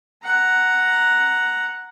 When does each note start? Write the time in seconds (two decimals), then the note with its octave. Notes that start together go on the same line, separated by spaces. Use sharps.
0.24 F#5 A#5